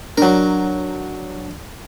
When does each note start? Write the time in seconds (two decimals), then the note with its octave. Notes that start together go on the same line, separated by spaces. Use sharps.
0.18 F#3 D4 A#4